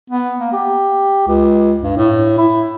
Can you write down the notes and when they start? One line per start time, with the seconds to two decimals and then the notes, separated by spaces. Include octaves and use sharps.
0.10 B3
0.39 A#3
0.53 G4
1.27 C#2
1.83 G2
1.97 A2
2.38 E4